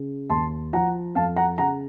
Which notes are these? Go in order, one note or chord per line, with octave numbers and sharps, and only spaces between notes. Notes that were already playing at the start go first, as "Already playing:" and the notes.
Already playing: C#3
D#2 A5 C6
F3 F#5 A#5
F2 F5 A5
F#5 A#5
C#3 F#5 A#5